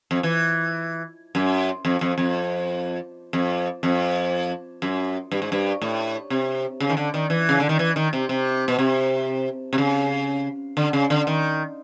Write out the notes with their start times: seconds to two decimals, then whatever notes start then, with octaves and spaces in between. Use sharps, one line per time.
0.11 F2
0.23 E3
1.35 F#2
1.85 F2
2.01 F2
2.18 F2
3.33 F2
3.83 F2
4.82 F#2
5.31 G2
5.42 G#2
5.52 G2
5.82 A2
6.30 C3
6.80 C#3
6.90 D#3
6.97 D3
7.14 D#3
7.30 E3
7.49 C#3
7.60 D3
7.69 D#3
7.79 E3
7.96 D#3
8.13 C3
8.29 C3
8.68 B2
8.79 C3
9.73 C3
9.78 C#3
10.77 D3
10.93 C#3
11.10 D3
11.27 D#3